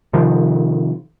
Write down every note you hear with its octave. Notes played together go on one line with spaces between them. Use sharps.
C3 D#3 F3